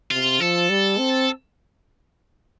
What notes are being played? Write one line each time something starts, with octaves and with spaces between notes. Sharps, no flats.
C3 F4
F3 A4
G3
C4